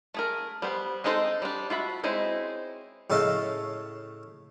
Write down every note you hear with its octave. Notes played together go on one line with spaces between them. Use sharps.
A3 G#4 A#4
G3 B3 C5
G#3 C4 D#4 A4 C5
G3 D4
F4 F#4 E5 B5
G#3 C4 C#4 D#4 E4
A2 C#3 A3 A4 D#5 F5